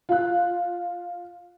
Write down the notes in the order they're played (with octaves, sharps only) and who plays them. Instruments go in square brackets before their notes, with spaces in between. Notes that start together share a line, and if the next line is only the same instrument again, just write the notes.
[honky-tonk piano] F4 F#6